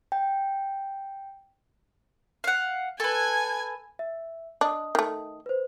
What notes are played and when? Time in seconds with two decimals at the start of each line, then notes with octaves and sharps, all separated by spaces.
0.12 G5
2.44 F5 F#5
3.00 A4 B4 G#5 G#6
3.99 E5
4.61 D4 D#5 D#6
4.95 D#3 A3
5.46 B4 C5